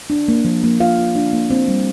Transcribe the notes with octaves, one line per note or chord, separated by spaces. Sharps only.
D4
A#3
F3
A#3
F4 F5
F4
D4
A#3
C4
G3